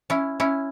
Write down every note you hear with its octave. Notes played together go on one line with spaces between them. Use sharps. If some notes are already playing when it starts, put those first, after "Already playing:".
C#4 E4
C#4 E4